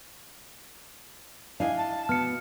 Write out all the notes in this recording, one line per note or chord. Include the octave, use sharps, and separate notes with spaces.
D4 E4 D#5 F5 G#5
A5
B2 B3 F6 C#7